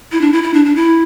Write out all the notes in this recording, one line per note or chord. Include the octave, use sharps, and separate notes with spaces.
E4
D4
E4
E4
D4
D4
E4